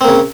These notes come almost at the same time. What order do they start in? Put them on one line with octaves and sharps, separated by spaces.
C4 A#3 C#3